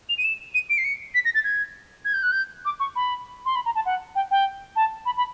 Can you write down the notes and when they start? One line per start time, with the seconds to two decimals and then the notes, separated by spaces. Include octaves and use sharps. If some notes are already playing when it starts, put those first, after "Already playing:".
0.09 F7
0.18 D#7
0.24 E7
0.54 D#7
0.69 D7
0.78 C7
0.84 C#7
1.14 B6
1.25 A#6
1.34 A6
1.44 G#6
2.05 G#6
2.13 G6
2.23 F#6
2.31 G6
2.65 D6
2.79 C#6
2.95 B5
3.45 C6
3.55 B5
3.65 A#5
3.75 A5
3.85 F#5
4.15 G5
4.31 G5
4.76 A5
5.05 B5
5.17 B5